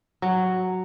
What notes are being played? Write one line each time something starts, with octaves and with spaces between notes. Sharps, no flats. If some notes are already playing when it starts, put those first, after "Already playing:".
F#3